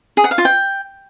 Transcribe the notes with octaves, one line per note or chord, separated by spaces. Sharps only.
G#4
F#5
F5
F4
G5